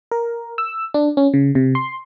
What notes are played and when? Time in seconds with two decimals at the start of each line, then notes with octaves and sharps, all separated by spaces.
0.12 A#4
0.58 E6
0.94 D4
1.17 C#4
1.34 C#3
1.55 C3
1.75 C6